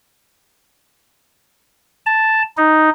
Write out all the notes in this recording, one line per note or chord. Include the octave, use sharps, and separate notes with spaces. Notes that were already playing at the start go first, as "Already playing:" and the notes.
A5
D#4